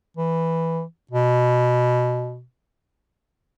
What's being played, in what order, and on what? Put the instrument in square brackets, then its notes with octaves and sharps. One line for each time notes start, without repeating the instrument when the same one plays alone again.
[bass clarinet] E3
B2